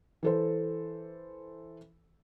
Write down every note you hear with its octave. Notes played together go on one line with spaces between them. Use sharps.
E3 A4 C5